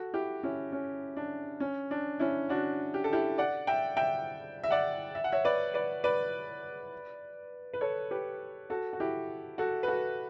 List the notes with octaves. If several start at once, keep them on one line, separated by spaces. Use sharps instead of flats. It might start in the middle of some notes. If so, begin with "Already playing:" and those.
Already playing: F#4 A4
E4 G4
C#4 E4
C#4
D4
C#4
D4
C#4 E4
D4 F#4
G4
A4
E4 G4
D5 F#5
E5 G5
E5 G5
E5
D5 F#5
E5
F#5
C#5 E5
B4 D5
B4 D5
B4 D5
B4
A4 C#5
G4 B4
F#4 A4
F#4
E4 G4
F#4 A4
B4
F#4 A4